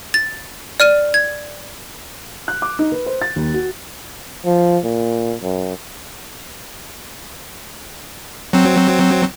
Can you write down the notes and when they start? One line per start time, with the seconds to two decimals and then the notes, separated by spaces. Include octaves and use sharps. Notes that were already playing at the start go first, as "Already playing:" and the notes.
0.14 A6
0.80 D5 F6 D#7
1.14 G#6
2.48 F#6
2.62 D6
2.79 D#4
2.92 B4
3.06 C5
3.22 A6
3.36 D#2
3.54 F#4
4.45 F3
4.84 A#2
5.41 F#2
8.53 F#3 C4